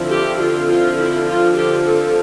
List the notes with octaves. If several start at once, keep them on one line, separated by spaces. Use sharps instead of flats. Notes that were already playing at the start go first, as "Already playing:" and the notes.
Already playing: D3 F3 C4 E4
G4
F4
F4
E4
F4
G4
A4